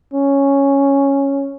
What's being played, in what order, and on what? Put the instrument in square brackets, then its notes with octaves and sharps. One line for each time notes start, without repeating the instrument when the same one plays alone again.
[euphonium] C#4